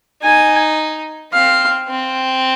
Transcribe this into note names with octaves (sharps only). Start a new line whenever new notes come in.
D#4 G#5
C4 F5
C4